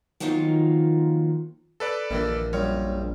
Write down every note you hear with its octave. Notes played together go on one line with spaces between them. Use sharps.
D#3 F3 F#3 A#3 D#4 F4
A4 B4 D5
A#1 D#3 E3 A#3
F#2 G3 F4 C#5